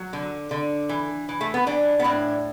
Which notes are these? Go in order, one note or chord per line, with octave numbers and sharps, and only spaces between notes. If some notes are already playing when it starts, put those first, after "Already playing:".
Already playing: F#3
D3
D3
E3
E3
A3
B3
E3 D4
B3
A2 D4